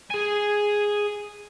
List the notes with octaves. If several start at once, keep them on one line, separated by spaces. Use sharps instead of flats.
G#4 G#5